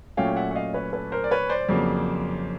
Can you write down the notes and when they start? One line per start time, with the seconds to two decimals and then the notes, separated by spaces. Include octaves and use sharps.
0.17 A#2 F#3 A3 C#4 F5 G5
0.36 E5 F#5
0.51 F#5
0.55 D#5 F5
0.74 B4 C#5
0.93 A4 B4
1.12 A#4 C5
1.24 D5
1.31 B4 C#5
1.49 C5 D5
1.69 F2 C#3 F#3 A#3